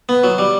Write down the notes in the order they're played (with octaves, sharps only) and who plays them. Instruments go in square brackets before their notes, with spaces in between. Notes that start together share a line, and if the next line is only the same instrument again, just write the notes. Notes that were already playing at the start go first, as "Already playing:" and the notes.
[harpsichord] B3
F#3
G3